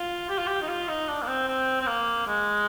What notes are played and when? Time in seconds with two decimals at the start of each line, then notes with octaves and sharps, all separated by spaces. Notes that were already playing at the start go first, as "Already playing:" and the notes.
Already playing: F4
0.29 G4
0.38 F4
0.47 G4
0.62 D#4
0.68 F4
0.88 D#4
1.08 D4
1.22 A#3
1.27 C4
1.48 C4
1.81 C4
1.86 A#3
2.27 G#3